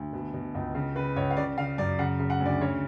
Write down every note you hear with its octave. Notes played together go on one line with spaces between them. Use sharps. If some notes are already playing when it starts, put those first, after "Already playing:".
Already playing: D2
B2
B2
C#2
C#3
C#3 B4
C#2 C#5
F5
C#3 D5
C#3 F5
F#2 D5
C#3 F#5
C#3
F#5
D2
D5
C#3 C#5